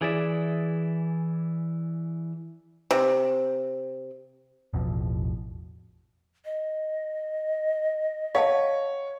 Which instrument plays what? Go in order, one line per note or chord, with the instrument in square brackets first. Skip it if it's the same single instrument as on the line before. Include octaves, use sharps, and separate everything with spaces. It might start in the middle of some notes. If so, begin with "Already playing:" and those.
[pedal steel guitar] E3 G#4 D5 E5
[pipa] C3
[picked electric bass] A1 E2 B2 F3
[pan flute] D#5
[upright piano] C#5 [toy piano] F5 F#5 A5